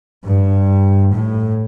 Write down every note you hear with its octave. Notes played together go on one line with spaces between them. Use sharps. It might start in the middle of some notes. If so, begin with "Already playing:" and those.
G2
A2